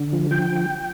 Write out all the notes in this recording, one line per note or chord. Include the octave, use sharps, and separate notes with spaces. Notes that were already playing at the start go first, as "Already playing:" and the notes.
Already playing: D3
F3
F3 G5